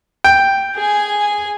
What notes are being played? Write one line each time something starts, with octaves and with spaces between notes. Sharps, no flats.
G5
G#4 G#5